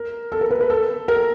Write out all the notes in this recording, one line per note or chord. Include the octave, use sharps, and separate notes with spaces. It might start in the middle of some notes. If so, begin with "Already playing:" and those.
Already playing: A#4
A4
A#4
B4
B4
A4
A#4